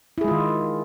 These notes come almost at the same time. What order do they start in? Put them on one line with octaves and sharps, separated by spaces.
E4 G#4 G#3 F4 D#3